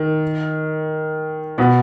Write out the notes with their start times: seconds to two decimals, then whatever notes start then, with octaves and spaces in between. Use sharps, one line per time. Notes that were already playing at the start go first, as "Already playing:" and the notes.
Already playing: D#3
1.58 B2 B3